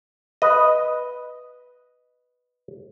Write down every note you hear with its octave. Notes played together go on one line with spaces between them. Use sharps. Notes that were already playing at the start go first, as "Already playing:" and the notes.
B4 D#5